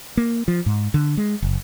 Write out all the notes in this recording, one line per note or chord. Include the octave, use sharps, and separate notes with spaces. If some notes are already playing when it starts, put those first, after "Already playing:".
A#3
F3
G#2
D3
G#3
F#1